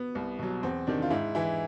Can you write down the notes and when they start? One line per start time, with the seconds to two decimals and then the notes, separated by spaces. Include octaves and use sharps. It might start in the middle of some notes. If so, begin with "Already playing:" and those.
Already playing: B3
0.15 C2
0.39 B2 F#3
0.63 E2 C4
0.87 C3 D#3 D4
1.02 F4
1.11 G#2 E4
1.35 E3 E4